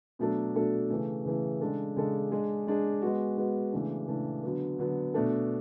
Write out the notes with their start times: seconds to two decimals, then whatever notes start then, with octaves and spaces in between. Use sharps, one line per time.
0.19 B2 F#3 A3 D4 A4
0.55 B2 F#3 A3 D4 A4
0.90 C#3 E3 A3
1.25 C#3 E3 A3
1.61 C#3 G#3 D4 A4
1.96 C#3 G#3 D4 A4
2.32 G#3 D4 G#4
2.67 G#3 D4 G#4
3.02 G#3 B3 F#4
3.37 G#3 B3 F#4
3.73 C#3 E3 A3 D4
4.08 C#3 E3 A3 D4
4.43 D3 F#3 B3
4.79 D3 F#3 B3
5.14 B2 A3 D4 A4